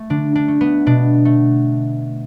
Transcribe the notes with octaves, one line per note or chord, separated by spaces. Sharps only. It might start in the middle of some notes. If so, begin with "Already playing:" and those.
Already playing: A3
D3 D4
D4
A3
B3
B2 D4
A3